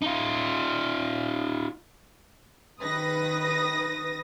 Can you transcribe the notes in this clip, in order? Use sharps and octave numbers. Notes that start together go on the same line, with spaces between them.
D#4 F4
D#3 B4 D#6 A#6